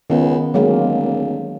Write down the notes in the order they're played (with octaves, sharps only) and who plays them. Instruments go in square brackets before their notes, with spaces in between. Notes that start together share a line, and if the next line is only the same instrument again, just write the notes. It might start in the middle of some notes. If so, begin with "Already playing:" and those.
[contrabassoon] C#2 [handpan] D#3 B3
[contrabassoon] D1 [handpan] F#3 G#3 A#3